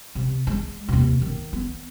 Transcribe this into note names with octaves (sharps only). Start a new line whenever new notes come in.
C3
G#3
D#2 C3
D#3
B3